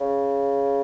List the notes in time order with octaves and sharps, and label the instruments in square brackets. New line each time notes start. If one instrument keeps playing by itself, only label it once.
[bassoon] C#3